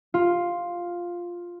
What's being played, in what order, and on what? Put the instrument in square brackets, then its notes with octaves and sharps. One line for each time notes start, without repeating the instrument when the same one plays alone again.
[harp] F4